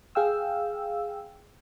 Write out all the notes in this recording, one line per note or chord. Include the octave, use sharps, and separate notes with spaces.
G#4 F5 G5 E6